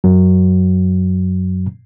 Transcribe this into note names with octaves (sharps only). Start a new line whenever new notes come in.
F#2 F#3